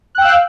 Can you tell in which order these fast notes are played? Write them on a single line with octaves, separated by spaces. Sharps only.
F#6 G5 E6 F5